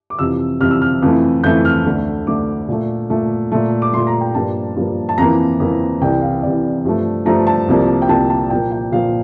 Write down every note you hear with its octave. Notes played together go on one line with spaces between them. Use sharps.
D6
F2 C3 E3 E6
F2 C3 E3 F6
E6
F6
F2 E3 A3
F2 E3 A3 G6
F6
D2 D3 A3
D2 D3 A3 D6
A#2 A3
A#2 A3
A#2 A3
D6
A#2 A3 C6
A#5
G5
G2 F3 A#3 A5
G2 F3 A#3
A5
F2 E3 A#3 A#5
F2 E3 A#3
C2 C3 E3 G5
F5
C2 C3 E3 D5
G2 F3 A3
G2 F3 A3 A#5
A5
C2 C3 F3 A#3
G5
C2 C3 F3 A#3 A5
A5
A#2 F3 A#3 G5
G5
A#2 F3 A#3 F5